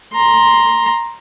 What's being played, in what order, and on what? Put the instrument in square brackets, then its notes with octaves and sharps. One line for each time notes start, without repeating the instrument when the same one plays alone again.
[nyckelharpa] A#5 C6